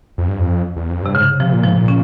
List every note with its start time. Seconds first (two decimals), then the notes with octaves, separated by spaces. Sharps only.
0.18 F2
0.28 G2
0.39 F2
0.77 E2
0.89 F2
1.02 G2 C3
1.15 G#2 C#3
1.40 C3 F3
1.53 A#2
1.64 G#2 F3
1.77 A#2
1.88 C#4